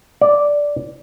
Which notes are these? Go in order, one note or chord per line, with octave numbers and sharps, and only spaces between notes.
D5